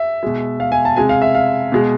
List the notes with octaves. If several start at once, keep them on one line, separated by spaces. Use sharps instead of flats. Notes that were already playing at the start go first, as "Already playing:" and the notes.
Already playing: E5
B2 G#3
F5
G#5
A5
C3 G#3 G#5
F5
E5
F5
B2 G#3